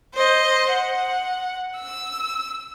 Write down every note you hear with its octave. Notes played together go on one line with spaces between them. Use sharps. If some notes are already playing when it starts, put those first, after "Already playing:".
C5 D#5
F#5
E6